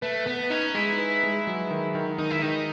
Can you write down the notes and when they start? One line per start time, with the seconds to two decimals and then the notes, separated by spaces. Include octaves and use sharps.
0.02 A3 B4
0.26 B3 B4
0.50 C#4 D#4
0.75 G#3 E4
0.98 B4
1.23 G#3
1.47 F#3
1.71 D#3
1.95 D#3
2.18 D#3 D#4
2.31 E4
2.42 D#3 D#4